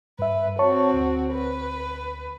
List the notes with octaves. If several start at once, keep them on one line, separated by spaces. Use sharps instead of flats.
G2 B4 E5
C4 F#4 C#5 A5 C#6
D2
B4